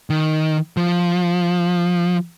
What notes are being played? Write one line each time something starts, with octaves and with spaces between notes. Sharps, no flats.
D#3
F3